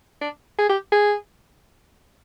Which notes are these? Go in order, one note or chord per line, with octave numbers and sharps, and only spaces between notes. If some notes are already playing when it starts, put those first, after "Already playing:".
D4
G#4
G4
G#4